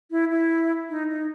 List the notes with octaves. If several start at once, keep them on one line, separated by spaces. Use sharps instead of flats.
E4
E4
D#4
D#4